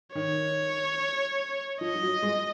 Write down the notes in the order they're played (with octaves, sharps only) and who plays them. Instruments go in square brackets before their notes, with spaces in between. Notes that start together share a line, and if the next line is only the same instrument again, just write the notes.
[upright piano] D#3 [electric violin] C#5
[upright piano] F3 [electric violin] D#5
[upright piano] F3
F#3
G#3